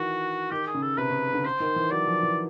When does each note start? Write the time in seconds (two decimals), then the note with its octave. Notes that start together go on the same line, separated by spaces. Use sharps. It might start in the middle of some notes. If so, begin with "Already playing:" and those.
Already playing: D#3 E3 F#4
0.51 D#3 G4
0.67 G#4
0.74 C#3
0.82 A4
0.98 C3 B4
1.10 C#3
1.33 D3
1.44 D3 C5
1.60 D#3
1.76 E3
1.91 F#3 D5
2.07 F3
2.23 E3